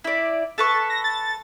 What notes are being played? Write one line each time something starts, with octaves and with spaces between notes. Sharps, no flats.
E4 D5
A4 B4 C#6 A6
A#6
A6